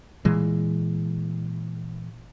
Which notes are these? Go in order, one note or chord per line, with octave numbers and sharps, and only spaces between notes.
A#2 E3 G#3